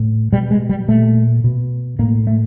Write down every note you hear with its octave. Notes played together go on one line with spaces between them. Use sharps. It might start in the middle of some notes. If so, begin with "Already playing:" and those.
Already playing: A2
B2 G3
G#3
G3
A#2 A3
B2
A2 A#3
A3